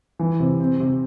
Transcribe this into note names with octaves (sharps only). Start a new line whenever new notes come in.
E3
C3
C4
C3